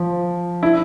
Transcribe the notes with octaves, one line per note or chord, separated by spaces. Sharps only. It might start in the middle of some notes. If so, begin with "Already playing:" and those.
Already playing: F3
E4